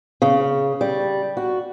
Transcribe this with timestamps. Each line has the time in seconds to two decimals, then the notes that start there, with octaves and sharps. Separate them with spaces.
0.22 C#3
0.81 G3
1.37 F#4